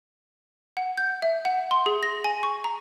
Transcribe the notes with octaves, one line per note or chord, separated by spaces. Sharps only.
F#5
G6
E5
F#5
C6
G#4
A#6
G#5
C#6
A#5